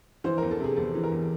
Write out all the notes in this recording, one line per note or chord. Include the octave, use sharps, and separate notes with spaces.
E3 C5
E2 A#4
A4
C3 G#4
E2 A4
E3
A#4
E2